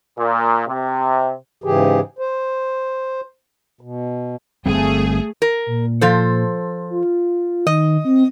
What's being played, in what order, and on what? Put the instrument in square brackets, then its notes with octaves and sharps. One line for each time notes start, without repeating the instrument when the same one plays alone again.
[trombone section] A#2
C3
[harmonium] G#2 C#3 E3 G4 G#4
C5
B2
[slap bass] G1 G3 C4 [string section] A3 G#4
[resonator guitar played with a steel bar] A#4
[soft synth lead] A#2
[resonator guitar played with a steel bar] F3 A4 C5
[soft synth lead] F4
[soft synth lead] D#3 [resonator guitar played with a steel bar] D#5
[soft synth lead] C4